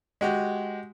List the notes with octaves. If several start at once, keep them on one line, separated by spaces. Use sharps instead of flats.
G#3 F#4 G4